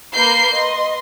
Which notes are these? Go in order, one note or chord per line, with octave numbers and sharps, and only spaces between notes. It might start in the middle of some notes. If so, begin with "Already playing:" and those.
A#3 A#4 B4 B5 G6 C7
B4 D#5 C6